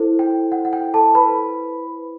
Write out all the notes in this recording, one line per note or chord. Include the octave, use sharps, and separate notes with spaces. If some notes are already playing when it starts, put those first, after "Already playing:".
Already playing: E4 A4 C5
G5
F#5
F#5
G5
A4 A5
B4 B5